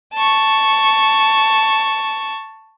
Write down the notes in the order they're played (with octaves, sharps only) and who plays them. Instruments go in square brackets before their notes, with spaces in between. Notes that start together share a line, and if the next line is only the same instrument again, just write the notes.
[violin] A5 C#6